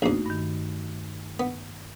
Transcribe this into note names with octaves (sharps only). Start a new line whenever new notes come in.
A#1 E2 A3 D#4 F#4
G2 D#3
B3